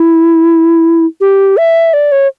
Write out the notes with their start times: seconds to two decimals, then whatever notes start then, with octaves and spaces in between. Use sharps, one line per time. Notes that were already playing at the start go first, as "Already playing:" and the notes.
Already playing: E4
1.21 G4
1.57 E5
1.93 D5
2.12 C#5